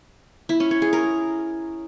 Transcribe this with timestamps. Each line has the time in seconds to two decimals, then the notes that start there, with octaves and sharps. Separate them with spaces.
0.49 E4
0.60 C#4
0.71 C#5
0.82 G#4
0.93 A#4